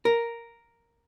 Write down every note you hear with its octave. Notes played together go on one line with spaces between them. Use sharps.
A#4